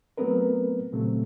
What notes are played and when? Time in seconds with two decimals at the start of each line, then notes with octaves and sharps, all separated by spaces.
0.18 F#3 A3 B3 C4 A#4 B4
0.92 A#2 C#3 F#3 G3 A3 C4